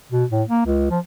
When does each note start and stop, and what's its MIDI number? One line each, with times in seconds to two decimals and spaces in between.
0.12 0.24 47
0.31 0.43 45
0.48 0.64 58
0.66 0.89 37
0.90 0.99 53